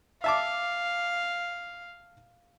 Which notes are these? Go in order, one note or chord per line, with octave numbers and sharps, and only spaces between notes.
E5 F5 A5 D6